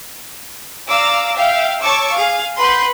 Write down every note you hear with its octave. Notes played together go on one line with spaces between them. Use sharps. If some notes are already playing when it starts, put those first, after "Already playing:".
D5 F5 A#5 D6 E6
E5 F5 G5
C#5 A5 C#6 D6 E6
G#4 F5
B4 F#5 B5 C6 G6